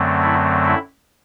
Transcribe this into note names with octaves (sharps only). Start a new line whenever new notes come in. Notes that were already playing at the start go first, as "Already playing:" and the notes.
Already playing: F#2 D3 F#3 A3 C4
E4
E4